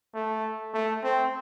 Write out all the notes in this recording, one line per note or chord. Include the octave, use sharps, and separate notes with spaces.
A3
A3
C4